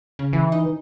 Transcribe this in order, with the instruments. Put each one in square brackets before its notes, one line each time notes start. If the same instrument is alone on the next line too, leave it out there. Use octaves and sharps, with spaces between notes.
[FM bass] C#3
[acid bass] E3
[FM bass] D#4